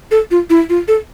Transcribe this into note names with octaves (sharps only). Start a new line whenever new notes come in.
A4
F4
E4
F4
A4